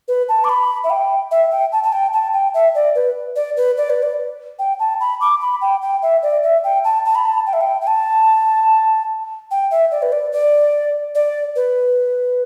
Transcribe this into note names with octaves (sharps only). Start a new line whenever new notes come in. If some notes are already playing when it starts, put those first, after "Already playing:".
B4
A5
D6
B5
E5
G5
E5
G5
A5
A5
G5
A5
G5
E5
D5
B4
D5
B4
D5
B4
D5
G5
A5
B5
D6
B5
G5
G5
E5
D5
E5
G5
A5
A5
B5
A5
G5
E5
G5
G5
A5
G5
E5
D5
B4
D5
D5
D5
B4